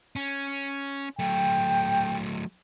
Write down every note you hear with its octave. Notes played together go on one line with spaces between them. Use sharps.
C#4
F#3 A3 G5